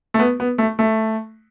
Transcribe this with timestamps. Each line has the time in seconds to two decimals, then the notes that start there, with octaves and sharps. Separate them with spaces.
0.14 A3
0.19 B3
0.40 B3
0.58 A3
0.79 A3